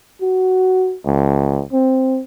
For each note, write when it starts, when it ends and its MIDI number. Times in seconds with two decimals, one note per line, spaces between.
0.22 0.96 66
1.06 1.62 37
1.73 2.21 60